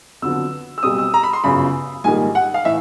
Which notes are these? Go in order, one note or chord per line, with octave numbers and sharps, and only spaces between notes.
F2 D3 F#3 B3 E6
E6
B1 B2 G3 C4 D#6
E6
A#5
B5
C6
G1 F#2 C#3 B5
A#1 G#2 D#3 G3 A#3 G#5
F#5
F5
A2 E3 E5